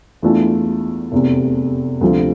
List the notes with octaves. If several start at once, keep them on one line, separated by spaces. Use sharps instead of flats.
E2 E3 A3 D4 F4
F1 E2 C3
D2 C3 F3